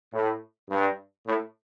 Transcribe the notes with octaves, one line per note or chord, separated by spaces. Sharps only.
A2
G2
A2